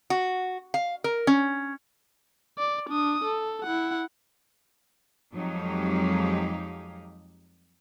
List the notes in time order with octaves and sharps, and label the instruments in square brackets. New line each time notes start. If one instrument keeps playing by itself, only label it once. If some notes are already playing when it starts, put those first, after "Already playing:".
[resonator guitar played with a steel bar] F#4
F5
A#4
C#4
[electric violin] D5
D4 D#6
A4
E4 F#5
[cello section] F2 F#3 G#3 D#4 G4 F5